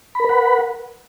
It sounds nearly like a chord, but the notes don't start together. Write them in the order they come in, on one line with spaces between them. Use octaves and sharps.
B5 A#4 B4 F#5